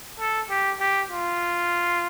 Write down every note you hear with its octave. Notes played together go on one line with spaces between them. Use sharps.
A4
G4
G4
F4